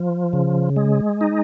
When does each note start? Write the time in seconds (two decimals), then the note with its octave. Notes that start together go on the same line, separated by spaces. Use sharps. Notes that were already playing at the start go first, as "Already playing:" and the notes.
Already playing: F3
0.33 C#3
0.76 G#3
1.21 D#4